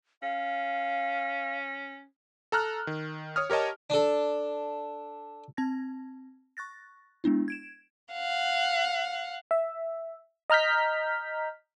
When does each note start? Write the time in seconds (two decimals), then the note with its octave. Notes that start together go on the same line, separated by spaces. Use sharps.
0.22 C#4 F5
2.52 A4 A#5 F6 F#6
2.87 D#3
3.36 C#5 D#6 F6
3.50 G4 A#4 C#5 D#5 A5
3.90 D4 A4
5.57 C4 A5 G#6 A#6
6.57 C#6 F#6 A6 A#6
7.24 G#3 B3 D4 E4
7.48 G#6 D7 E7
8.13 F5 F#5
9.51 E5
10.50 D#5 A#5 F6 G6 B6